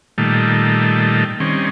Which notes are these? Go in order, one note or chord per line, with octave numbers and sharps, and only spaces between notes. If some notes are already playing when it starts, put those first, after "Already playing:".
A#2 D#3 G3 A3
D#3 G3 C4 C#4